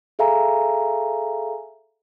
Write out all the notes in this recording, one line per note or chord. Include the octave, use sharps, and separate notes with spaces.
G#4 A4 E5 F5 G#5 A#5